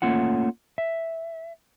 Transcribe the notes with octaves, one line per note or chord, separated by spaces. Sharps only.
A3 A#3 C#4 F4 F#5
E5